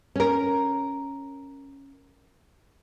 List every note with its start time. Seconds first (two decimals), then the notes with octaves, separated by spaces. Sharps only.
0.16 C#4 A#4